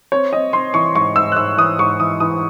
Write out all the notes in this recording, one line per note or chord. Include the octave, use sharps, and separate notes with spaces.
C4 C#5
C4 D#5
C4 C6
E3 C#6
G#2 C#6
G#2 E6
F#6
G#2 E6
E3 D#6
G#2 C#6
E3 D#6
E3 D#6